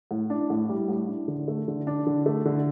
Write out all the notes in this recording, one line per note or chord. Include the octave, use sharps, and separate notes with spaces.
A2
D4
A2
G3
A2
D4
D3
A3
D3
D4
D3
A3
D3